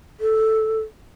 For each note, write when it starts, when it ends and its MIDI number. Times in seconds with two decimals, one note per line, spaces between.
0.20 0.79 69